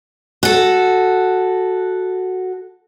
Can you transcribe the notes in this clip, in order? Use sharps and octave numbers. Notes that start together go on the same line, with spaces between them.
F#4 A4